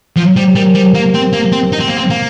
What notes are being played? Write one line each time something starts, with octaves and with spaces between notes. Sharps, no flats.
F3
G3 C5
G4
G3 A#4
A#4
G3 C5
A#3 C5
C4
A#3
C4
D#4 C5
C4
A#3
C4
A#3